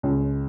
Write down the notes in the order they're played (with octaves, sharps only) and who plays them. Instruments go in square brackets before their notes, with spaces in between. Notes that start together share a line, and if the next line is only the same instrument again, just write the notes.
[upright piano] C#2